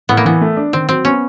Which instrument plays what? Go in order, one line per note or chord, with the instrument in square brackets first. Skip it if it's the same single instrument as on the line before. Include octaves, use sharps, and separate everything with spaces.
[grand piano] A2 [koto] B3
[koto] A#3
[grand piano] E3 [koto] B3
[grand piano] A3
D4
[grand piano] D#3 [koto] C4
[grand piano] F#3 [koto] C4
[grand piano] B3 [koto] C#4